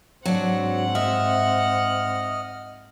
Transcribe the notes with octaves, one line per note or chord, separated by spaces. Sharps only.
G#2 F#3 C4 D4 F#5
D#5 E5 F6